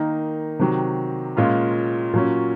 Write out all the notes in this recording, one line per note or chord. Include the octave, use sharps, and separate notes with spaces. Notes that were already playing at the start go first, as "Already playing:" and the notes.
Already playing: D#3 A#3 D#4 A#4
C3 D#3 F#3
A#2 G#3 C#4 F4
A#2 F#3 C#4